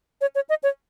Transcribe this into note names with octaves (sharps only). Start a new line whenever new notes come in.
C#5
C#5
D#5
C#5